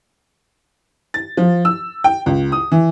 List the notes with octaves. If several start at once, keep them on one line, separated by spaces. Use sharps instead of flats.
A6
F3
E6
G5
C#2
D#6
E3